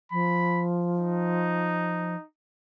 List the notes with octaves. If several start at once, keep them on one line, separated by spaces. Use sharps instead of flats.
F3 B5
D#4